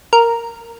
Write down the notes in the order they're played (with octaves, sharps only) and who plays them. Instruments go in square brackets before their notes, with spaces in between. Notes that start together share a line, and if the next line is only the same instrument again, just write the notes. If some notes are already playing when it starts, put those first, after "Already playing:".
[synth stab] A#4